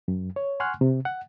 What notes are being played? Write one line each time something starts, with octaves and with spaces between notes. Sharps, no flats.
F#2
C#5
F#5 G#5 C6 C#6 F6 F#6
C3
F#5